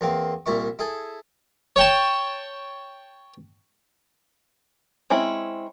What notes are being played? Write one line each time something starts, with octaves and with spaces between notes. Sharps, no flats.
E2 A#3 C4
C2 A#2 E4 C#6
E4 G#4 A4
C#5 G5 A5
G#3 C4 C#4 E4